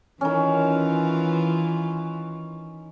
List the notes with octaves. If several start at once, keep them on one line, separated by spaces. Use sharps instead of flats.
D#3 E3 C#4 F4